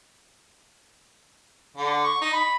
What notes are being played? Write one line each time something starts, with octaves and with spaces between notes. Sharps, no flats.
D3
C#6
D#4
B5